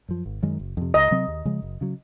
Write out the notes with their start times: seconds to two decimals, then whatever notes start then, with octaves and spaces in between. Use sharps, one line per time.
0.09 F#2 F3
0.26 G#1
0.43 F#2 D#3 G#3
0.59 F#1
0.77 F2 C3
0.94 C#2 D#5
1.11 C3 F#3 C4
1.28 D#2
1.45 C#3 F3 G#3
1.62 F#1
1.81 C#3 F#3